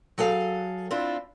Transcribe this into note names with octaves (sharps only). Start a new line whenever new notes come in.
F#3 G#4 A4 F5
C4 D4 E4 F4